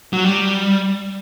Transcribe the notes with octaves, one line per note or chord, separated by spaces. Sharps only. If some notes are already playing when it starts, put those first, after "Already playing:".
F#3
G3